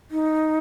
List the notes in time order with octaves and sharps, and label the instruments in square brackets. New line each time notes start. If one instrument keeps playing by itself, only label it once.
[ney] D#4